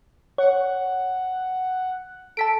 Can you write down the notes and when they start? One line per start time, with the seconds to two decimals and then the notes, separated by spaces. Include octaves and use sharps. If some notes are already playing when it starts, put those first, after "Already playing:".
0.38 C#5 F#5
2.37 A4 A5 B6 D7